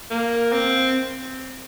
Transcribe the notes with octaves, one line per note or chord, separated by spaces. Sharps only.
A#3
C4